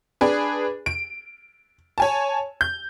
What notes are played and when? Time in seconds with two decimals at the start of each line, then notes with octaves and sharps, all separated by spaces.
0.21 D4 G#4 B4
0.86 D7
1.98 C#5 G#5 A5
2.61 G6